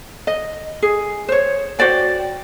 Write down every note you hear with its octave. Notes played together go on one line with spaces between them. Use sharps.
D#5
G#4
C5 C#5
F#4 C5 D5 G5